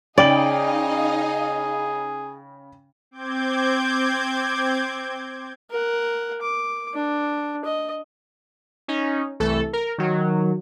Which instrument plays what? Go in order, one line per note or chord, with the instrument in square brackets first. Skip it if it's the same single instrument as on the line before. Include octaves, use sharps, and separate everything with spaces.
[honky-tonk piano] C#3 G5 F#7 [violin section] D#4 D#5 F5 [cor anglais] G#4 [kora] D5
[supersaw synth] C4 D6 G6 G#6
[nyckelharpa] A#4 F#5
D6
D4
D#5
[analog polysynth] C#4 D#4
C2 E3 A3 A4
A#4
D#3 F#3